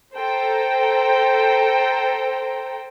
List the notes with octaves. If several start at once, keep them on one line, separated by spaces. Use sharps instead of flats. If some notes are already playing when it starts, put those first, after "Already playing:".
A4 C5 G5 A#5